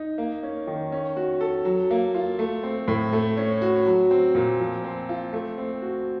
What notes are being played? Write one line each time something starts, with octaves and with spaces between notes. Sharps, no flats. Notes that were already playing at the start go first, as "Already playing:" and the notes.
Already playing: D#4
A#3
C#4
D#3
C#4
F#4
A4
F#3
A#3
F4
A3
C4
A2
A3
C#4
F#4
F#3
C4
A#2
F3
C4
F4
A3
C4
F#4